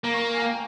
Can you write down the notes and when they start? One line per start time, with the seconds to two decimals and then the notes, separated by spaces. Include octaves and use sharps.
0.04 A#3 A#5
0.14 C#6
0.33 F5 G#5
0.42 G5